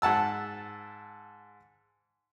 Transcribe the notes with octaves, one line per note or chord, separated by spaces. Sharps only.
G#2 F#5 A5 E6